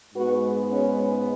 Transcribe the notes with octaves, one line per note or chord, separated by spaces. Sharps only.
G#2 G#3 B3 F#4 B4
C#4